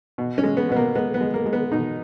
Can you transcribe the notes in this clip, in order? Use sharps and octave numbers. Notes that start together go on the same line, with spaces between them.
B2
C#4
G#3
B3
B2 B3
A#3
G#3 B3
B3
G#3
A#3
G#3
B3
B2 D#4